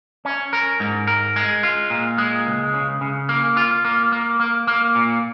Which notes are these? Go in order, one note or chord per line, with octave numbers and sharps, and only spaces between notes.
C#4
A#4
G#2
A#4
G#3
F4
A#2
G#3
C#2
C#3
C#3
A#3
F4
A#3
A#3
A#3
A#3
A#2